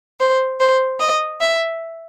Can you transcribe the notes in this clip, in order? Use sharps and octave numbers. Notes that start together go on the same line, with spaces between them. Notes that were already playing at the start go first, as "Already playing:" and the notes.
C5
C5
D#5
E5